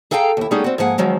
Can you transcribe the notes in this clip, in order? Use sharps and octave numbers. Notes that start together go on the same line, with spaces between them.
G#4 A4 F5 G5 G#5 A#5
D#2 E4
G3 A3 B3 C#4 D#4 G#4
C4 F#4
G#2 F3 A#3 G#4 F#5
D#3 F3 F#3 G#3 C4